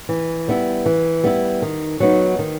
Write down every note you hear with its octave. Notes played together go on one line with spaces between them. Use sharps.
E3
G3 B3 E4
E3
G3 B3 E4
D#3
F#3 B3 D#4
D#3